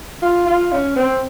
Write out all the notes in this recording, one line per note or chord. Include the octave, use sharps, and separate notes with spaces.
F4
F4
C#4
C4